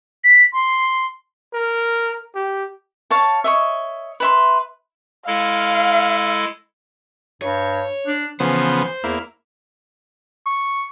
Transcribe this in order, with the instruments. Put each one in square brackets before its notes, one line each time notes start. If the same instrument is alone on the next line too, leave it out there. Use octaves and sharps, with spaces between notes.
[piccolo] B6
C6
[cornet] A#4
G4
[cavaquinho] C#5 F5 A5
C#5 D#5 E5
B4 E5 C6
[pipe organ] G#3 E4 A4 [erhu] F5
[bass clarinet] G2 [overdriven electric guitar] C#5
[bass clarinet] D4
[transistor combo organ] C#3 F3 B3 [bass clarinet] E3 [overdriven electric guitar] C5
[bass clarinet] E2 [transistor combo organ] A#3 E4
[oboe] C#6